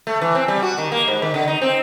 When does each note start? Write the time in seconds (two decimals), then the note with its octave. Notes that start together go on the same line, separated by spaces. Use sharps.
0.07 A3
0.21 E3
0.35 C4
0.48 G3
0.63 F#4
0.78 D#3
0.92 A#3
1.08 G#2
1.22 D#3
1.34 D3
1.48 D#4
1.61 C4